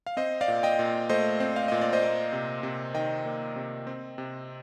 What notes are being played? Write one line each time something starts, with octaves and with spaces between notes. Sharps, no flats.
F5
C4 C5 D#5
D5 F5
A#2
D#5 G5
A#2
A3 C5 D#5
C4
F5
A#2 D#5
D5
C5 D#5
A#3
C3
C3
D#3 D#5 G5
A#3
C3
C4
C3